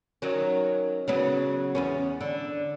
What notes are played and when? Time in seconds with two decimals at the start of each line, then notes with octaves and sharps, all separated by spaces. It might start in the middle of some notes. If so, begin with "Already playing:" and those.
0.22 D#3 F#3 C#4
1.08 C#3 F#3 B3
1.75 E2 B3 C#4
2.21 D3